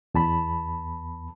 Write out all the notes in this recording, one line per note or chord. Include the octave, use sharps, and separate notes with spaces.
E2 A5 B5